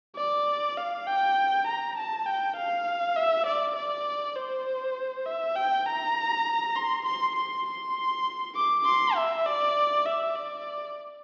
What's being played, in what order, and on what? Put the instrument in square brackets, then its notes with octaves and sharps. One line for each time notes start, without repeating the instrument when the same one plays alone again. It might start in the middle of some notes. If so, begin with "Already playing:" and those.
[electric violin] D5
F5
G5
A#5
A5
G5
F5
E5
D5
D5
C5
E5
G5
A#5
C6
C6
C6
C6
D6
C6
E5
D5
E5
D5